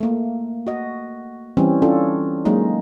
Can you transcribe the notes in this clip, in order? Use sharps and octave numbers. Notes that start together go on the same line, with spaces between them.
A3 A#3
F#4 D#5
E3 G3 C4 C#4
C#4 D4 F4 A4
F#3 G#3 A#3 D#4